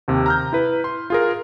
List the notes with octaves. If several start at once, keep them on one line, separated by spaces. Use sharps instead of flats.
D#2 C3
A#5 F6 G6
E4 B4
C6
F4 G#4 A#4